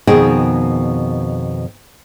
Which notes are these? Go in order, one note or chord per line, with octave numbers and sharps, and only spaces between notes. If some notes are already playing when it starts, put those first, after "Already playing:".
F2 B2 D#3 G#4 D#5 G5